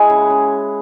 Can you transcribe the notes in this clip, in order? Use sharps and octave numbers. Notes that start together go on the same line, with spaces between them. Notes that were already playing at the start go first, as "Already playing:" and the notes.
Already playing: G#3 E4 F#4 G#4 F#5 G#5
C#3
C#3